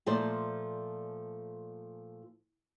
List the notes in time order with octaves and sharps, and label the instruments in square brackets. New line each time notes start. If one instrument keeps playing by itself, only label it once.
[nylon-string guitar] A#2 F3 A3 C5 D5